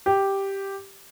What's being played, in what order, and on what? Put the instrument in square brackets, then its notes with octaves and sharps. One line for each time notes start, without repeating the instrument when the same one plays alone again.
[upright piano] G4